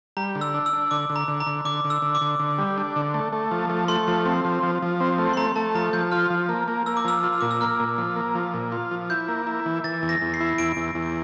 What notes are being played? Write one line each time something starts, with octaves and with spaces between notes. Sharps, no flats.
G3 A#5
D3
E6
D4
E6
D4
D3 D6
D3
A#5
D3
A#5
D3
D3 D6
D3
E6
D3
D6
D3
D3
G3
D4
D3
A3
A3
F3
A3
A3 C6
F3
C4
F3
F3
F3
C4
A3
C6
A3 A#5
A3 A5
F3 A#5
F3 G6
F4 F6
F3
A#3
A#3
A#3 E6
D6
F3 E6
F4
A#2 D6
E6
A#3 F6
A#2
F3
A#3
F3
A#2
F4
F3
E4 G6
A#3
E4
E3
E3 A6
E2
A#6
E2
C7
E4
E2 D7
E2
E2